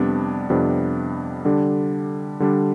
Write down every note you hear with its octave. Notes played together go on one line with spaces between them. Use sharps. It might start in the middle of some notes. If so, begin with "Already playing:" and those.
Already playing: F2 C3 G3 B3 D4
F2 C3 G3 B3 D4
D3 G3 D4
D3 G3 D4